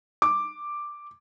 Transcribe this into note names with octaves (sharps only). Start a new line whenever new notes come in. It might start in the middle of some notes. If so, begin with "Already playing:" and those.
D6